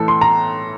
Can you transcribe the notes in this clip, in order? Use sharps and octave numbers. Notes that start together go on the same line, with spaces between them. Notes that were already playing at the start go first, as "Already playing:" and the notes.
Already playing: A2 E3 A4
C6
A#5